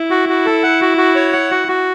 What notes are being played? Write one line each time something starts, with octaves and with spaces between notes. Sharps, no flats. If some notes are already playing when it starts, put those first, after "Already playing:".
Already playing: E4
F#4
F#4
A4
F#5
F#4
F#4
C#5
F#5
F#4
F#4